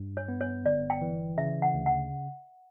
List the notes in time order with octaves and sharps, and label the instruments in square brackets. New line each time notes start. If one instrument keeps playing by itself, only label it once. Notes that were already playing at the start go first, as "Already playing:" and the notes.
Already playing: [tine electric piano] G2
[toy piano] C#5
[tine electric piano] B3
[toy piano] C#5
[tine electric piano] G1 [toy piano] D5
[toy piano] G5
[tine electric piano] E3
[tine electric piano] C#3 [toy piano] E5
[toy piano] F#5
[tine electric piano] D2
[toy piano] F#5